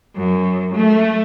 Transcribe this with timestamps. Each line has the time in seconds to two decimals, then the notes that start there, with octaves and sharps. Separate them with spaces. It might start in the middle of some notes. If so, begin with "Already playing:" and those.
0.15 F#2
0.73 A3